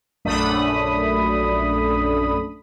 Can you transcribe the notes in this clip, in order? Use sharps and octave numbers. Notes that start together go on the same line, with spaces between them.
A#1 F#2 A3 D4 B5 D#6